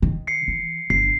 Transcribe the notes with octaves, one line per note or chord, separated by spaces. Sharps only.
D#3
C7 C#7
E3
G1 C7